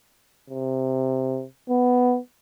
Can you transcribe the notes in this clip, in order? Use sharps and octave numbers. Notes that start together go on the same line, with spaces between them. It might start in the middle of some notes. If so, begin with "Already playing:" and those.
C3
B3